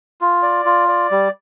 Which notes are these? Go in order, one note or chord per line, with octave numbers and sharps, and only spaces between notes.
F4
D5
F4
D5
G3